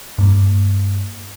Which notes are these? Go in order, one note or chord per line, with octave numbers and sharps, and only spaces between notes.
G2 A#3